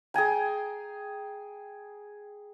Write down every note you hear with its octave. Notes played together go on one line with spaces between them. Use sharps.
G#4 G5 G#5 A#5